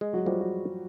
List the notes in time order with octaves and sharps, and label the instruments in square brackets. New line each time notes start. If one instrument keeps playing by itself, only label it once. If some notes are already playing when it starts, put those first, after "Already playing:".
[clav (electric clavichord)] G#3
[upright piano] F#3 F#4
[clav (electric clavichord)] F3 [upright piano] G3 G4
[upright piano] F#4